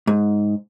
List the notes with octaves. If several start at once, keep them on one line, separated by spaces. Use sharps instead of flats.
G#2